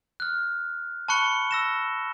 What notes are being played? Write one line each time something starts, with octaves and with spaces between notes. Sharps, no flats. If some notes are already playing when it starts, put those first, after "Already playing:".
F6 F#6
A5 B5 C#6 F#6 C#7 G7
E6 A#6 E7